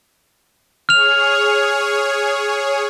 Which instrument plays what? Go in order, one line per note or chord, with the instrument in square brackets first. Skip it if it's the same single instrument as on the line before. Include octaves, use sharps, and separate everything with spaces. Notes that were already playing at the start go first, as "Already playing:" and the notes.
[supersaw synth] G#4 C#5 [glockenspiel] F6 F7